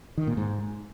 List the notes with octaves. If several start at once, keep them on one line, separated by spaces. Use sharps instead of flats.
D#3
A#2
G#2